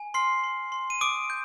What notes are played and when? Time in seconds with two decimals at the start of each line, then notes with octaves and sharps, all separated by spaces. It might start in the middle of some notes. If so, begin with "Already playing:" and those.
Already playing: G#5
0.14 C6 F6 C7
0.44 C6
0.72 C6
0.90 D#7
1.01 D6 D#6 D7
1.30 G6